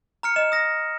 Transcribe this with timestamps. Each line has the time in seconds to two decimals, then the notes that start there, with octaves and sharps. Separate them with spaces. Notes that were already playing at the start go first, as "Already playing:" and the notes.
0.23 A#5 F6 C#7
0.36 D#5 E7
0.52 D#6 A#6